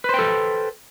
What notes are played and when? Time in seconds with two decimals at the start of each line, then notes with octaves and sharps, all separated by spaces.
0.04 B4
0.09 C5
0.14 G5
0.19 A4